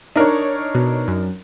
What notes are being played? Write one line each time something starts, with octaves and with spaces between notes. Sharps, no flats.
D4 D#4 A#4 C#5
B2
F#2